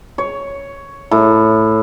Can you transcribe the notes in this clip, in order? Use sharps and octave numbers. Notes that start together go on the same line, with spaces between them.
C#5
A2